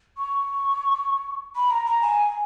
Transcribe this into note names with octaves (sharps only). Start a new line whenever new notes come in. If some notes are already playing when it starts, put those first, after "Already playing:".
C#6
B5
A#5
A#5
G#5